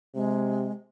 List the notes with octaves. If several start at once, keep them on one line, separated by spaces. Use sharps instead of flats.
C3 G#3